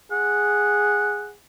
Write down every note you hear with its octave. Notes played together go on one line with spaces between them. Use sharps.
G#4 F#5